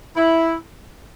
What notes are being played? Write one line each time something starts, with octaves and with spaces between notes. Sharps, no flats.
E4